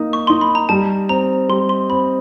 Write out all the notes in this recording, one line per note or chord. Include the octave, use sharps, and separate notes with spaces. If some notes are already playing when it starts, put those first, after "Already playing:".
Already playing: A#3 D#4
C#6
D#4 C6
B5
A#5
G3 A5
C4 A#5
G3 C6
C6
C4 B5